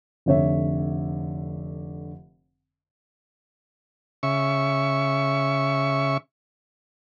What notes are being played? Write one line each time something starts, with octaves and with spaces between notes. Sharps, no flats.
F1 D3 C#5 E5
C#3 E5 C#6